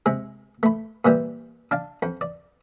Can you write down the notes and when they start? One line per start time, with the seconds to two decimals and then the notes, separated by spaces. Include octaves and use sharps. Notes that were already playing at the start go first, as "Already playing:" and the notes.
0.06 C3 G#3
0.63 A3 B5
1.05 A#2 E3 G3
1.71 D4 F5 A5
2.02 F2
2.21 D5